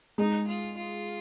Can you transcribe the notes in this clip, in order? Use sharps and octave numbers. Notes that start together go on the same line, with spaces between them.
G#3 D#4
F4
F4